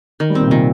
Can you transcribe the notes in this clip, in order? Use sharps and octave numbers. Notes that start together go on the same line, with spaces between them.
D#3
G3
A#2 C4
C3
A#2 D#3